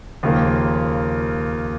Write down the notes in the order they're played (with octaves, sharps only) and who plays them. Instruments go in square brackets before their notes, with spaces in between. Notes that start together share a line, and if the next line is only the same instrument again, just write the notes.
[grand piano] D#2 C#3 F3 A#3 F4